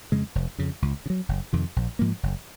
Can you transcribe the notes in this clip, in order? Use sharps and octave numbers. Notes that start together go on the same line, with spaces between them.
F2 C#3 G#3
F1
F2 C#3
C#2
C#3
F#3
F#1
F2 C3 D#3
A#1
G#2 F3 A#3
F#1